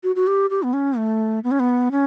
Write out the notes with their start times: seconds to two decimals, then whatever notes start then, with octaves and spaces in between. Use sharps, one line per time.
0.03 F#4
0.16 F#4
0.27 G4
0.50 G4
0.63 B3
0.73 C#4
0.97 A3
1.44 B3
1.51 C#4
1.60 B3
1.92 C#4